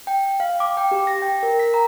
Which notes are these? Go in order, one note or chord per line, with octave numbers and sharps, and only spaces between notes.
G5
F5
D6
G5
G4
A#6
G5
A#4
B6
A#5